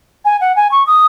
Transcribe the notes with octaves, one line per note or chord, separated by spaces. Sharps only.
G#5
F#5
G#5
C#6
D#6